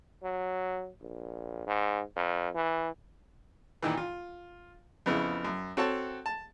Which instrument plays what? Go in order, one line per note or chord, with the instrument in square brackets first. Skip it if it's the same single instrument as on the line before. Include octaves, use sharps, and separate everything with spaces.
[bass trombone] F#3
A#1
G#2
F2
E3
[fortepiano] A#2 D#3 E3
F4
F2 C#3 B3 E4
F#2
C4 F#4 A4 C#5 F#5 A5
A5